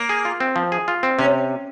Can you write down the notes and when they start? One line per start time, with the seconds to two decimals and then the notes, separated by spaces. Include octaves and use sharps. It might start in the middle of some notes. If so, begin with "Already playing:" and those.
Already playing: A#3
0.09 G#4
0.25 F4
0.40 C4
0.56 F3
0.72 G#4
0.88 F4
1.03 C4
1.19 C3 C#4